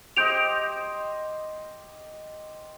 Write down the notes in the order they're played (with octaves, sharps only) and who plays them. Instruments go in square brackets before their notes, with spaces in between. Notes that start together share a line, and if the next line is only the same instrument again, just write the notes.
[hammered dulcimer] G4 C5 D#5 [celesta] G6 D7 F7